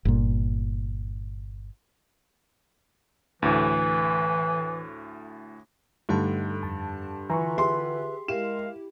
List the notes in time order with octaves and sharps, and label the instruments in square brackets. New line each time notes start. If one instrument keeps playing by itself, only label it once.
[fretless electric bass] G1 A#2
[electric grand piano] D2 A2 [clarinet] E3
[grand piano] G2 D3 [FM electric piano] A3 D#4 A4
[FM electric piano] F2 A5
[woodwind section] D3 F4 B4 [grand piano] E3 [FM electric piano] A#5 C6 C#6
[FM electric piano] G4 G#4 E5 [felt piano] C6
[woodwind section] G#3 A#4 F5 [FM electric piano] E4 G4 [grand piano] E7